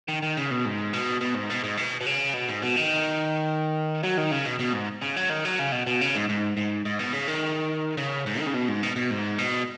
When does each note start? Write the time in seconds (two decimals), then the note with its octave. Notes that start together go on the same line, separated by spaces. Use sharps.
0.08 D#3
0.22 D#3
0.37 C#3
0.51 B2
0.65 G#2
0.93 B2
1.21 B2
1.35 G#2
1.50 B2
1.64 G#2
1.77 B2
2.01 B2
2.06 C#3
2.34 B2
2.48 G#2
2.62 B2
2.76 D#3
4.03 F#3
4.17 D#3
4.32 C#3
4.46 B2
4.60 B2
4.74 G#2
5.02 C#3
5.16 F#3
5.30 D#3
5.45 F#3
5.59 C#3
5.72 B2
5.87 B2
6.01 C#3
6.15 G#2
6.29 G#2
6.57 G#2
6.85 G#2
6.99 B2
7.13 C#3
7.27 D#3
7.97 C#3
8.26 G#2
8.39 D#3
8.47 C#3
8.54 B2
8.68 G#2
8.83 B2
8.96 B2
9.11 G#2
9.39 B2